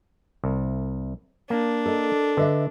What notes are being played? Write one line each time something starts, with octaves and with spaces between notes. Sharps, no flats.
C2
A#3 D4
A4 A#4 D#5
D3 B4 D#5 E5